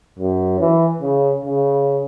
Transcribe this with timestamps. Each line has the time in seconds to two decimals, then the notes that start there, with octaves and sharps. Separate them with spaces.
0.19 F#2
0.60 E3
1.01 C#3
1.46 C#3